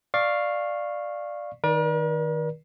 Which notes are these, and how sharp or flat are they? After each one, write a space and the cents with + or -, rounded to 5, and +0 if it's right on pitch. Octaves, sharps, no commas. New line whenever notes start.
D5 +10 F5 +0 C#6 -15
D#3 +0 A#4 +45 D5 +0